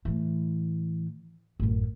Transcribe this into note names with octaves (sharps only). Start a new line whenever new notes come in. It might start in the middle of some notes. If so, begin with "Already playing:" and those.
A2 E3
A1 F#2